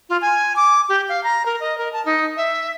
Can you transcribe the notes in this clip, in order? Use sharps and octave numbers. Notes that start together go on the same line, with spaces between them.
F4
G#5
D6
G4
F5
A#5
A#4
D#5
A#4
A5
D#4
E5